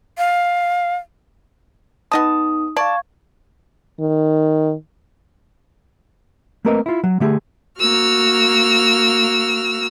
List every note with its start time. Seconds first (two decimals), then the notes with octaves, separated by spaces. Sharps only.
0.18 F5
2.12 B3 D#4 D#5 A5 D#6
2.77 D5 F5 A5 C#6 G#6
4.00 D#3
6.65 A3 A#3 C4 A#4 B4 D#5
6.86 E4 F4
7.04 F#3
7.20 D3 A3 G4 G#4
7.80 A#3 F#4 E6 F6